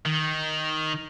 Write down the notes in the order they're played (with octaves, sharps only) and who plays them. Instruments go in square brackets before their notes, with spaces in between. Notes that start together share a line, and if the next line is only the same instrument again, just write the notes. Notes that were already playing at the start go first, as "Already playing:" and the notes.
[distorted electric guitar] D#3